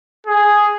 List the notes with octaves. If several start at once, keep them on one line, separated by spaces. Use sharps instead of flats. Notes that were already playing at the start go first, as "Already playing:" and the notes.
G#4